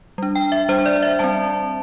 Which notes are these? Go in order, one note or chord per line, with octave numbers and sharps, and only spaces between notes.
G3 D4
G5
E5
G3 D4 C5
D5
E5
G3 C4 A5